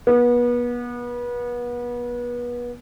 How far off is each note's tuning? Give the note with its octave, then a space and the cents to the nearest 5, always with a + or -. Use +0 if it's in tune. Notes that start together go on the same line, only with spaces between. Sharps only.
B3 -30